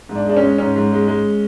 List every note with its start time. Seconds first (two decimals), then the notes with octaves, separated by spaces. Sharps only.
0.09 G#2
0.15 D4
0.26 G#3 D4
0.37 C#4
0.42 G#3
0.58 G#2 C#4
0.76 G#2
0.92 G#3
1.07 G#3